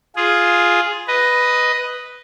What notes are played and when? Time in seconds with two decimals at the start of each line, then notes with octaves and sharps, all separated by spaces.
0.16 F4 G#4
1.07 B4 D#5